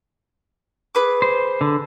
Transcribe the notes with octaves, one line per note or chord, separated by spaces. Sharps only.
G#4 B4 D6
C5
D3